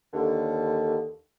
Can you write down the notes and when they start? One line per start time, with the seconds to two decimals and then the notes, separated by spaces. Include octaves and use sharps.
0.14 D#2 D3